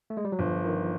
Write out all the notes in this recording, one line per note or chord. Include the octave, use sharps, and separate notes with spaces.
A3
G#3
G3
F#3
G1 F3
D#3